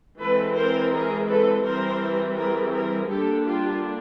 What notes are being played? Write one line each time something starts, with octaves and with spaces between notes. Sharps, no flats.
E3 G#3 C4 A4 B4
A#4 C5
G#4 A#4
A4 B4
E3 G3 C4 A#4 C5
G#4 A#4
G#4 A#4
D3 G3 A#3 D4 G4 A4
F4 G4